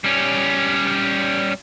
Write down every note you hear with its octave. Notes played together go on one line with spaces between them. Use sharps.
G3 C#4